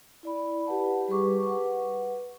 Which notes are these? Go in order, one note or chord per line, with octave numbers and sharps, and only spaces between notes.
E4 D5 B5
G4 B4 F#5 A5
G3 G4 G#4 B4 C#6 D6
B4 F#5